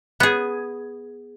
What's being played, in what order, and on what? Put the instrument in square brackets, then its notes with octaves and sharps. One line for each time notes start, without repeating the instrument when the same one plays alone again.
[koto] B3 G#4